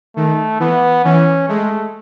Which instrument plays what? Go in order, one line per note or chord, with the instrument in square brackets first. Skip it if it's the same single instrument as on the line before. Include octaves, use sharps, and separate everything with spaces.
[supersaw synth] D#3 [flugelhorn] A3
[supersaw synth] E3 [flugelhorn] B3
[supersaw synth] E3 [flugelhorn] C#4
[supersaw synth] G#3 [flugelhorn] A3